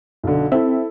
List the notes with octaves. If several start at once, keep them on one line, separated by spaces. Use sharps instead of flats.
B1 D3
C4 E4 A4 E5